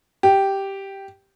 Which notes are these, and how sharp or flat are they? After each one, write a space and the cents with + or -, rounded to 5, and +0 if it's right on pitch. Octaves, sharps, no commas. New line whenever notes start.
G4 -5